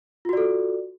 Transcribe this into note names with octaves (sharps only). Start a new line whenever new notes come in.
F4 F#4 A4 D5